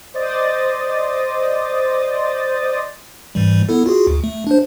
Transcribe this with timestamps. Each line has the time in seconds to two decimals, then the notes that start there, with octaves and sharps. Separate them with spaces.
0.14 C5 D5 D#5 D#6 A6
3.35 G#2 E3 G3
3.69 B3 E4 A4
3.86 F4 F#4 G#4
4.07 D2
4.24 A3
4.47 D4 C5